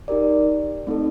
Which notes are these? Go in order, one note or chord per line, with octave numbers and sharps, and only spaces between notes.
D#4 G4 A#4 D5
A3 C4 D#4 A4